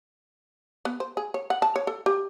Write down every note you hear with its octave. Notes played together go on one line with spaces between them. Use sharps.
B3
C5
G#4
C#5
F#5
A5
C#5
A4
G4